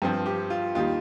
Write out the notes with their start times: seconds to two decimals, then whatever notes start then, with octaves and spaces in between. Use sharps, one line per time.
0.02 G2 F3 C4
0.26 G4
0.50 F4
0.75 D#2 D#3 G3 F4